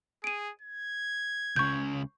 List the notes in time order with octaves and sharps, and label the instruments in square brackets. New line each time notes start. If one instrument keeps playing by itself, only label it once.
[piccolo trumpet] G#4 [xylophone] D7 D#7
[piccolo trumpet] G#6
[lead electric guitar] C#2 C#3 [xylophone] C#6 G6